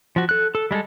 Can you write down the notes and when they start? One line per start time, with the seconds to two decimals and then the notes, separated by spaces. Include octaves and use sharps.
0.16 F3 F#4
0.29 A4 F#6
0.55 A4
0.71 G3 G#3 G#4 A4